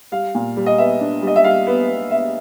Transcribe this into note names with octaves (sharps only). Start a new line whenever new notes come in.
G3 F5
A#2
G3
D#5
B3 E5
D4
G3 D#5
E5
G3 F5
B3
B3
B3 E5